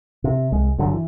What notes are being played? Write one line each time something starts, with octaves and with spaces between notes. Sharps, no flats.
C3
C2 G#3
G1 G2 D3 F#3
E3